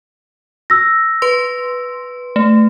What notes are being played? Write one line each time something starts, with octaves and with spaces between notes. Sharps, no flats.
E6 A#6
B4 C6
A3